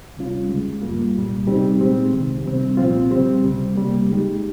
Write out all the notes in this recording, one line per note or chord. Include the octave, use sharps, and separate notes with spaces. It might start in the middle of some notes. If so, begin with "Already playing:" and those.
C#2 C3 G3 C#4 F4
D#2 C#3 G#3
G2 G3 A#3 F4
C2 A#2 G3
C3 G3 C4 D#4 G4
A#2 G#3 C4 G4
C2 C3 D#3
C3 G3 C4
C2 A#2 F3 C4 F4
C#3 G3 C4 G4
C#2 C3 G3
C3 G3 A#3
D#2 C#3 G#3 D#4 G4